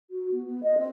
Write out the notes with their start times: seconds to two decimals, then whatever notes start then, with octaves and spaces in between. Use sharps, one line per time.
0.10 F#4
0.32 B3
0.46 B3
0.63 D#5
0.77 C4